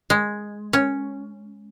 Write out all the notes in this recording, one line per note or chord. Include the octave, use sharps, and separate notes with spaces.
G#3
C#4